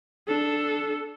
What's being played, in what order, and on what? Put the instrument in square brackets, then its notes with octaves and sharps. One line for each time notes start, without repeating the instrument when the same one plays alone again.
[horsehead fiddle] D4 A4